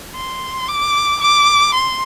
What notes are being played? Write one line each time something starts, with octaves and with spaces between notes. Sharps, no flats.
C6
D6
D6
C6